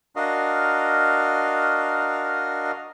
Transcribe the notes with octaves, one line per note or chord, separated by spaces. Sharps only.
D4 F#4 A#4 D#5 F5